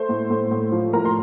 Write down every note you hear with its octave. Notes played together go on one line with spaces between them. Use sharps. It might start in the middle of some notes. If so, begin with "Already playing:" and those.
Already playing: A3 C5
A2
A2
A2
F3
A2 A#4 A#5
C6